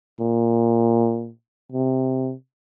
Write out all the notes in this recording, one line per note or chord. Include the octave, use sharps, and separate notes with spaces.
A#2
C3